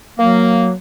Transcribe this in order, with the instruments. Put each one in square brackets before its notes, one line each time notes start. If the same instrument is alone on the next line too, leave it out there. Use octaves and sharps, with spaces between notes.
[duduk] F#3 [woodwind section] A#3